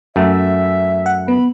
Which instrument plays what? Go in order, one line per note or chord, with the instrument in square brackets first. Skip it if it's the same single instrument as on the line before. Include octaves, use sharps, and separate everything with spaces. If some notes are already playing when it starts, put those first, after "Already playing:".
[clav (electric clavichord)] F#2 A3 [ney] E5
[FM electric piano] F#5
[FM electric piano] B3 [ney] B5